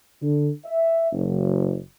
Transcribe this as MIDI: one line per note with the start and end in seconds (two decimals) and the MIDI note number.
0.21 0.48 50
0.64 1.09 76
1.12 1.76 30